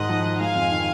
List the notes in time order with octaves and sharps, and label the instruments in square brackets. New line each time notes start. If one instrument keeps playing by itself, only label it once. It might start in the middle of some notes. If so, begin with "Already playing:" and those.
Already playing: [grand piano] G#2 D#3 G#3 [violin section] D#5 F#5
[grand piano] F3
D#4
[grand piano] G#3 [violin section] F5 G#5
[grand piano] F2
D#3